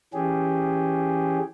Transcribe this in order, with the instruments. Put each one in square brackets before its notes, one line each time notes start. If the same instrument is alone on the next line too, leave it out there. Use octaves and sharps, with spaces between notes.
[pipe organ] E3 C#4 G4 G#4